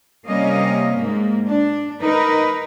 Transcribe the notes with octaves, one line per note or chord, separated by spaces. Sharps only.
C3 G3 A#3 C#4 D#5 F5
G#2 A#3
D4
D#4 A#4 B4